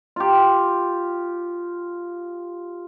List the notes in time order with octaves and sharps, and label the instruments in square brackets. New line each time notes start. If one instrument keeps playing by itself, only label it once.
[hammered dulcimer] F4 G4